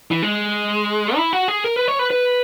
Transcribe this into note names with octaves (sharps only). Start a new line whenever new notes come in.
E3
G#3
E4
F#4
G#4
A#4
B4
C#5
B4
B4